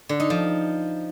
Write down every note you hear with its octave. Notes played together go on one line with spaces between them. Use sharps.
D3
D#4
F3